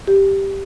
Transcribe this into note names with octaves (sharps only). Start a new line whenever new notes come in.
G4